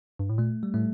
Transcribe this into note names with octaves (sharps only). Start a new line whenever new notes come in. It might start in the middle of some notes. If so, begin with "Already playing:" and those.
G2
A2
A#2 A3
G3
A2 A3